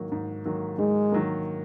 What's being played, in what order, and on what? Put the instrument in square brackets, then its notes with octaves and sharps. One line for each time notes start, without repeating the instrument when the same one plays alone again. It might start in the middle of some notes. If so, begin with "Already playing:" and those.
Already playing: [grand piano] G#2 D#3 F#3 A#3
G#2
D#3 F#3 A#3
[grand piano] G#2 [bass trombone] G#3
[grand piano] D#3 F#3 A#3